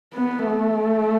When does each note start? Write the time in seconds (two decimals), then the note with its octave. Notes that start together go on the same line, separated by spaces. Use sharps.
0.14 B3
0.46 A3